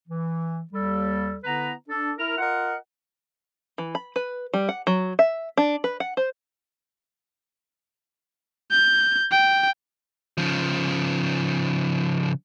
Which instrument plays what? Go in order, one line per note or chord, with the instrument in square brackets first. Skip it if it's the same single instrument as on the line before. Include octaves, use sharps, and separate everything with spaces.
[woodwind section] E3
D#2 G3 A4
D3 B3 E4 B4 A#5
D4 A4
E4 A#4 F6
F4 A#4 D#5 F#5
[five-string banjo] E3
B5
B4
G3
F#5
F#3
E5
D4
B4
F#5
C5
[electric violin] G6
G5
[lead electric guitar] C#3 F3